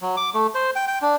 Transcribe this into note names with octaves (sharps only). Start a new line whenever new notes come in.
F#3
D6
A3
C5
G5
G5
D4